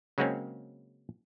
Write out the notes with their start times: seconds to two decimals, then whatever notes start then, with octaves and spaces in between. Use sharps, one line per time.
0.18 C#3 F#3 G#3 A#3 C4 C#4